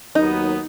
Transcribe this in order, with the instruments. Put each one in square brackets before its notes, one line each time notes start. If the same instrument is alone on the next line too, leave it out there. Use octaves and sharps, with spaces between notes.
[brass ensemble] D#2 D#3 F#3 B3 [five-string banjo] D#4